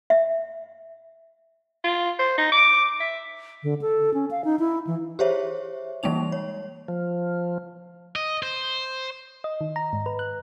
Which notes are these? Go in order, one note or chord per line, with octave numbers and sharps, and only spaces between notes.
E5
F4
C5
D#4
D6
E5
D3
A4
C#4
F5
D#4
E4
E3
G4 G#4 C5 C#5 E5
E3 G3 G#3 A#3 D#4 F7
C#5
F3
D#5
C5
D#5
D#3
A#5
G#2
B4
F#6